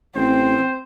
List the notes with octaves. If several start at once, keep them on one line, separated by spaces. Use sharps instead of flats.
A1 C4 C5